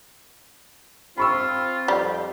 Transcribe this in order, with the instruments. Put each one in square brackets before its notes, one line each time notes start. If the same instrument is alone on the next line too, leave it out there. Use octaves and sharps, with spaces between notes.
[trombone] C4 [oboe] F4 [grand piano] B5 C#6 E6
[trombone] F2 [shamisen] G3